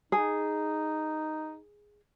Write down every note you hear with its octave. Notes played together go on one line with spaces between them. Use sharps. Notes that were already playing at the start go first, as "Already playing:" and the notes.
D#4 G#4